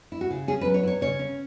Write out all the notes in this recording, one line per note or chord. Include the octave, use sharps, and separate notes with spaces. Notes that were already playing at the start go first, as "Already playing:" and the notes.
E4
F#4
C#3
C#4 G#4
B4
F#3
C#5
E4
C#5
C#3 C#5
C#4